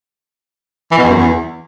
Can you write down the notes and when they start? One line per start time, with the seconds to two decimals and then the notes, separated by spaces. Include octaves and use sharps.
0.92 E3
0.98 B2
1.04 E2
1.10 F#2
1.16 E2